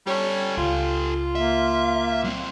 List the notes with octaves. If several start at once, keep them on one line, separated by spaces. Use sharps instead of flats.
G3 C#4 G4 A4 C#5
C#2 F4
A#3 E5
F#3 C4